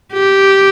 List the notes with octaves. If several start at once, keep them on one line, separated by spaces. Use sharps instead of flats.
G4